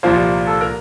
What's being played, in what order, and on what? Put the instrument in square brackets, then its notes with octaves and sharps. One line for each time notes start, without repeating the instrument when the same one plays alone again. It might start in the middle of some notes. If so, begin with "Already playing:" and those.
[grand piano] C2 A#2 F3 A#3 C5
A4
A#4